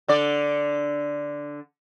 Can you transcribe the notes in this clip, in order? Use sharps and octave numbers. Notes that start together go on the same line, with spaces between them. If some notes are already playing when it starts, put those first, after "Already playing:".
D3 D5